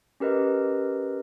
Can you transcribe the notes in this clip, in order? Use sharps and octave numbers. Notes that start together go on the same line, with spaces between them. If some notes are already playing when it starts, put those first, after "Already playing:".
C#4 G4 A#4 B4 D#5